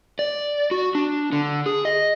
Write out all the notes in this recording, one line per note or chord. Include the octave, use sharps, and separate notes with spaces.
D5
F#4
D4
D3
G#4
D#5